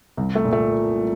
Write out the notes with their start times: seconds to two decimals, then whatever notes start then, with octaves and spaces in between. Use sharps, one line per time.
0.17 C2
0.35 A3
0.45 A#2
0.53 A3